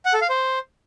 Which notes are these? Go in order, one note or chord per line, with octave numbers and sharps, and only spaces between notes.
F#5
A4
F5
C5